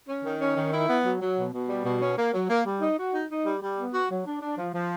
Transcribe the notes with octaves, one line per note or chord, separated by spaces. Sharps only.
C#4
D#3
C#4
D#3
E4
B3
F#3
F#3
B2
B2
G3
B2
C#4
A#3
F#3
A#3
G3
D#4
F#4
D#4
D#4
G3
G3
B3
F#4
F#3
D4
D4
F3
F3